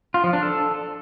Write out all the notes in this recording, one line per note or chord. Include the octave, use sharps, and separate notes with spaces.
F4
F3
D4
A4